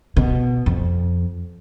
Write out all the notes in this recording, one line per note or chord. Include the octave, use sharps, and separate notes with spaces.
B2
F2